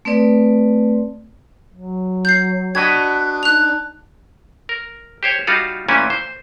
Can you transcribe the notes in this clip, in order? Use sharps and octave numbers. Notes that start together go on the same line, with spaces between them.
A3 C4 B4 D5
F#3
G6 C7
D4 F#4 B4 D#5 G#6
D#4 F#6 F7
A#4
G4 C5 C#5
G3 D#4 F4 F#4 F5
A#2 E3 A3 C#4 E4 G#5
C5